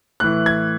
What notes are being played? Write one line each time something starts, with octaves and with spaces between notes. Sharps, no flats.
A2 E3 F#6
G#6